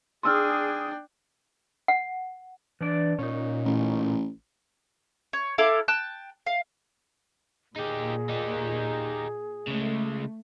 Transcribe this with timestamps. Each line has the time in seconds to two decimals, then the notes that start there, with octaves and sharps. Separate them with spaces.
0.23 D4 G#4 G5 C6 E6 F6
1.88 F#5
2.81 E3 D4 D5
3.19 A#2 C#4 D#4
3.65 A1
5.33 C#5
5.58 E4 A4 F5 D6
5.88 G5 A5 F#6
6.46 F5
7.76 A#2 D#4 G4 G#4
8.29 D#4 G4
9.68 C#3 G#3 A3